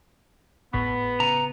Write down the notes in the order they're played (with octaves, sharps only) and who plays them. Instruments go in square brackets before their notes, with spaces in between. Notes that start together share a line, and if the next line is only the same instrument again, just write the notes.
[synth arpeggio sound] G#1 A2 C#6 [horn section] B3 [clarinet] B5
[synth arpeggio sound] C#3 C#7 D#7 [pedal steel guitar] A#5